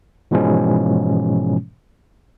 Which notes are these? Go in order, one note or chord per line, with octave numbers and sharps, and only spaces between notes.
G#2 B2 E3 F3 G#3 C#4